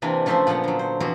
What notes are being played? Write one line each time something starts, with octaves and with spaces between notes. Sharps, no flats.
C3 E3 A#3 C4 D4
C#3 F3 A3 C5 E5 C6
A#2 F3 B3 C5 F#5
D3 F#3
C5
F2 B2 E3 F#4 C6